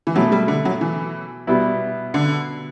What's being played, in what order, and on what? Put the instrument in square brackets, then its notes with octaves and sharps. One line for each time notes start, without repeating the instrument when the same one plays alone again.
[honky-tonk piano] E3
[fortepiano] B2 A3 E4 [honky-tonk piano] F#3
[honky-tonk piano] G3
D3
F#3
E3
[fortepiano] B2 G3 B3 E4
[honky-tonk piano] D3